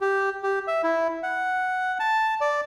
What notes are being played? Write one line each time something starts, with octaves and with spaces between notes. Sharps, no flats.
G4
G4
E5
E4
F#5
A5
D5